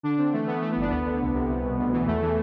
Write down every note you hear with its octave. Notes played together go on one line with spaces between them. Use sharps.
D3 D4
D3 C4
E3 A3
E3 B3
E3 A3
B3
G1 D4
D2 B3
D3
C2
C3
C2
B2
D2
E3
E2 A3
E3